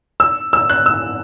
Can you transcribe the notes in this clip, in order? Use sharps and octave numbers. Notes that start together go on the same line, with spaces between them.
E6
E6
F#6
E6